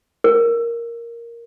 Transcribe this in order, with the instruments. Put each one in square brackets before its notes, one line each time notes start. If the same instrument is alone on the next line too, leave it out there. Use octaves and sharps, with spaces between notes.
[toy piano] A#4